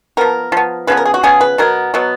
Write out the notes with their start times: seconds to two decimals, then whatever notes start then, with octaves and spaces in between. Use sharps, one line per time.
0.17 F3 B3 A#4
0.52 F3 B3
0.87 C#3 F3 B3 B4
0.97 A#4
1.05 G#4
1.14 F#4
1.23 C#3 F3 B3 G#4
1.41 B4
1.58 B2 F#3 B3 A#4
1.94 B2 F#3 B3